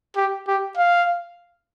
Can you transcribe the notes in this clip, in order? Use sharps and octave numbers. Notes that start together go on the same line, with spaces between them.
G4
G4
F5